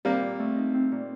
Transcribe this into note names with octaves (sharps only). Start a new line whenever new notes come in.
G3 A#3 C4
A#2
A3
D#4
C4
A#2